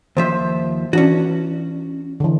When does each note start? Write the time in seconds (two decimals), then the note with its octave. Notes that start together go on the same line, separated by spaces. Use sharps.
0.17 D#2 F3 C5 E5
0.93 E3 C#4 D4 F#4
2.20 D3 E3